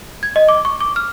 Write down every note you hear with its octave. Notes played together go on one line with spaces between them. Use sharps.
G#6
D#5
D6
C#6
D6
F6